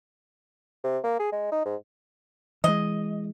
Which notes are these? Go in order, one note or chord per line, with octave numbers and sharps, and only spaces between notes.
C3
A#3
G#4
G#3
D#4
G#2
E3 G#3 D#5